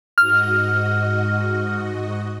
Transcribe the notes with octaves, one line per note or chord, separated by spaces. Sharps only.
G#2 F#4 D#5 F6